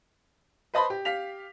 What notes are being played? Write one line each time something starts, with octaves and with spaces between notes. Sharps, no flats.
B4 C5 D#5 A5 B5 C6
G4
G4 F5 B6 F7